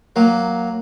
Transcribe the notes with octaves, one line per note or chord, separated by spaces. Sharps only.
F#3 A#3